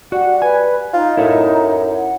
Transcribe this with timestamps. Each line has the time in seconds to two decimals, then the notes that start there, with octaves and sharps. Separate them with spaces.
0.12 G3 F#4 F#5
0.42 B4 G#5
0.94 D#4 F4
1.17 F#2 E4 A4 E5
1.96 F#5